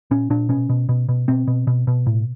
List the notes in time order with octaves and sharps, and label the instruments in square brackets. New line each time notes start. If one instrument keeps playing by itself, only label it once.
[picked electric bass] A#2 C#4
A#2 D4
B2 C#4
B2
B2
B2
B2 C4
B2
B2
B2
A2